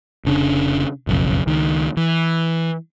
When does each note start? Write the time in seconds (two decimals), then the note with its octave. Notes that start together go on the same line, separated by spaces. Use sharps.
0.25 F1 C#3 D4
1.07 F#1 B1 F2 C#3
1.47 C#2 D#3
1.97 E3